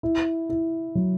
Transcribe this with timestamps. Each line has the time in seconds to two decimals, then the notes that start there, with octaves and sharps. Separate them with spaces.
0.03 E4
0.49 E4
0.95 F#3